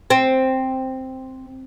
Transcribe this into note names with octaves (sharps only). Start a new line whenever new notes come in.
C4